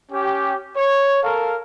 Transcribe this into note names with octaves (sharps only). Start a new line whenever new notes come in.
C#4 G4
C#5
A4 A#4 F5